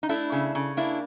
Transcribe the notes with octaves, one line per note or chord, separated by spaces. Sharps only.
D#4
A3 D4 E4
C#3
C#3
A#3 D4 E4